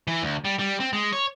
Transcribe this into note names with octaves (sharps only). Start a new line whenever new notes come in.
E3
D2
G3
G3
C4
G#3
C#5